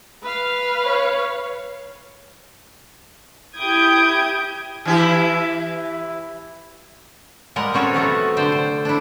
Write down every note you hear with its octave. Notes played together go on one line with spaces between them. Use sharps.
B4 F5
C#5
E4 G4 D#6 G6 G#6 D7
E3 E4 G4
G3 G#3 A#4 F#5
C4 C#4 F#4 A4 C#5
C3 F#3 A3 B3
D3 C5 G5 A5
C5
D4 E4